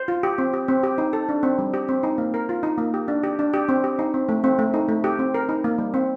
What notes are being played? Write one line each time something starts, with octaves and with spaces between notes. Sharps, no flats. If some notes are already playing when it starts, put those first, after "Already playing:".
Already playing: C5
F4
G4
C4
G4
C4
G4
D#4
A4
D4
C4
G3
G4
C4
D#4
A#3
A#4
F4
D#4
A#3
G4
D4
G4
D4
G4
C4
G4
D#4
C4
A3
C4
A3
D#4
A3
G4
C4
A#4
D#4
A#3
G3
C4